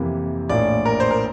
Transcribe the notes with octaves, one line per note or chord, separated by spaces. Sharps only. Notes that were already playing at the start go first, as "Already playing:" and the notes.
Already playing: F2 C3 E3 A#3
A#1 A2 F3 A#3 D5
A#4
C5
A#4